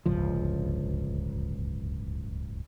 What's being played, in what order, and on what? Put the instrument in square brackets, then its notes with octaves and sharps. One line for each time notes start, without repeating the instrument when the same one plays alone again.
[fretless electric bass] D1 G1 C#2 F3